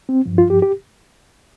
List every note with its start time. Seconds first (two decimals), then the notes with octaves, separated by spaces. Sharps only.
0.09 C4
0.26 G2 F3
0.38 F4
0.50 G4
0.62 G4